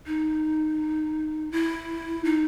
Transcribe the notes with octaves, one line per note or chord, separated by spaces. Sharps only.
D#4
E4
D#4